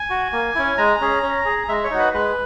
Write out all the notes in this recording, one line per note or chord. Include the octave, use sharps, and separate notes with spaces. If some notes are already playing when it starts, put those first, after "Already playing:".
Already playing: G#5
F#4
A#3
C#4 E4
G#3 A#5
C#4 G#4
C#4
G#4
G#3 E5
C#5
D#4 F#4
B4
G#3 B4